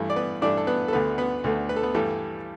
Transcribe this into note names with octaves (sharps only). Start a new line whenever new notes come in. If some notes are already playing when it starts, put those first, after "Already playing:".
Already playing: G2 E3 A3
D5
B3 B4
G2 E3 A3 D4 D5
A4
B3 B4
A4
D2 D3 A3 B3 B4
B3 B4
D2 D3 A3
B4
A4
B3 B4
G2 E3 G3 A3 A4